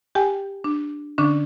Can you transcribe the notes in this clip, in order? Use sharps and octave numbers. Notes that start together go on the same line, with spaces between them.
G4 G5 G#5
D4
D3 C#4 D4